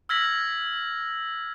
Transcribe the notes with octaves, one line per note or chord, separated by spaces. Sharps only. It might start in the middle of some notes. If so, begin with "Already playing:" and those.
E6 F6 G#6 A#6 B6 F#7